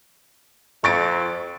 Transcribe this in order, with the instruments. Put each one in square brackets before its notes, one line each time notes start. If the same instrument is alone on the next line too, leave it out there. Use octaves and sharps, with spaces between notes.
[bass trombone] F2 [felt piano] C#6 A6 D7